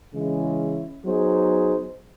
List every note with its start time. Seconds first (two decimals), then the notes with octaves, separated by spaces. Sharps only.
0.14 C#3 E3 G#3 C#4 E4
1.04 F#3 B3 D#4 G#4 C5